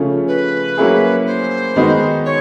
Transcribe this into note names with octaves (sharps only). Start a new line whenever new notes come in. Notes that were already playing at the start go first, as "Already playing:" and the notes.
Already playing: C#3 F3 A3 C#4 F4
B4
F#3 A#3 C#4 E4 G#4
C5
D#3 G#3 B3 D#4 F#4
C#5